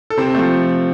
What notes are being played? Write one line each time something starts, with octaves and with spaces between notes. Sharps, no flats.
A4
C3 C4 C5
F3 A3